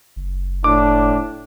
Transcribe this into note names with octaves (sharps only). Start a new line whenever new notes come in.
F#1
A2 D4 D6